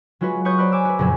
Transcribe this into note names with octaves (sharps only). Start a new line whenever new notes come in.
F#3 G#3 F4 F#4 B4
B4 C#5 C#6 D#6 G6
C5 D5 A#5 B5 F6 F#6
G#5 D6 E6
F#4 B4
F#1 F2 A#2 F#3 G#4